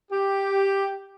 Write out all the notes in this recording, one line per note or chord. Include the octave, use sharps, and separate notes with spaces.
G4